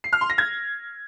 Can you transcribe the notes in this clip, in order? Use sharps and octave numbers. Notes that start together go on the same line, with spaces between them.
C7
F6
C6
A#6
G#6